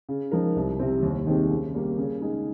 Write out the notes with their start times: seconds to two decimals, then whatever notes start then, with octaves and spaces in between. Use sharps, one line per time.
0.09 C#3
0.31 F3 G#3 D#4 A#4
0.56 C2
0.79 C3 G3 C4
1.03 D#2
1.27 D#3 G#3 C4 G4
1.50 C#3
1.74 G3 A#3
1.98 C#3
2.21 G#3 D#4 G#4